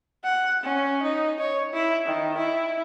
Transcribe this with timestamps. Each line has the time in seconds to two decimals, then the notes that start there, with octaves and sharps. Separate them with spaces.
0.24 F#5
0.64 C#4
1.03 D#4
1.40 C#5
1.73 E4
2.06 D#3
2.38 E4